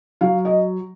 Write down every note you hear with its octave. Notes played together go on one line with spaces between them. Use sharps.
F#3 F5
D#5